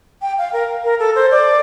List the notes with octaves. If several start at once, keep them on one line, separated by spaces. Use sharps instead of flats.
G5
F5
A#4
A#4
A4
C5
D5